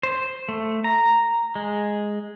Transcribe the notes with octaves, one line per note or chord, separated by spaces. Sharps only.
C5
A3
A#5
G#3